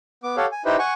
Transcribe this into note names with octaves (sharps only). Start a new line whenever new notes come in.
B3 D6
G4 A4 C#5 F5 F#5
G#5
D#4 E4 G4 B4 C5
F#5 G#5 C#6